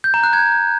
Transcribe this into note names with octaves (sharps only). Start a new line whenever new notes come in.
G6
A#5
F#6
G#6